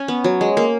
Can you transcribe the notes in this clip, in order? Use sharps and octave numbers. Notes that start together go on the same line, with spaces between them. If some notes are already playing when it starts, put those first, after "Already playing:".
Already playing: C#4
B3
F#3
G#3
A#3